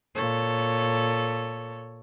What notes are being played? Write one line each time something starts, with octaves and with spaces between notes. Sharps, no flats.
A#2 A4 C#5